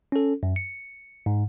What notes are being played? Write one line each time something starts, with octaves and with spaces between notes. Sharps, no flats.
C#4 A4
F#2
C#7
G#2